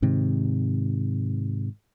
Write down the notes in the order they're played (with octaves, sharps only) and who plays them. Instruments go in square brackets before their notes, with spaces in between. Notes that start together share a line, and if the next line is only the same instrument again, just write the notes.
[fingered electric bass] G#2 C3 D#3